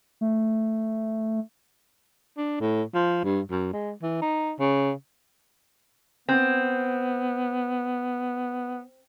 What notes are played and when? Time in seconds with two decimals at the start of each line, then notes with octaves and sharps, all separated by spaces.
0.21 A3
2.37 D4
2.61 A2
2.94 F3
3.24 G2
3.51 F#2
3.73 G#3
4.02 E3
4.22 D#4
4.60 C#3
6.28 B3 C4